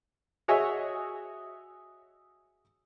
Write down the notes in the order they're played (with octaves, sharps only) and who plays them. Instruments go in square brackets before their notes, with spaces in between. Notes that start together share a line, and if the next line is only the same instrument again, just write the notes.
[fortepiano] F#4 G#4 C#5 D#5 E5 G#5